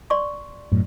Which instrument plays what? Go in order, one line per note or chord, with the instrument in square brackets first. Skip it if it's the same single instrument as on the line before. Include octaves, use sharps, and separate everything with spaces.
[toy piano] D5 C6 C#6
[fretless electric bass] F#2 A2